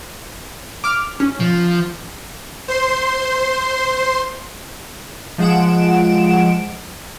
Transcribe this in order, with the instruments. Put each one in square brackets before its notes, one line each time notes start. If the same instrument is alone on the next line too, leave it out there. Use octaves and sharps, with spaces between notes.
[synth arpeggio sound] D6 F6
C#4
[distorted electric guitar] F3
[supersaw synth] C5 C6
[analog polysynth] F3 G#3 F#5 D7 E7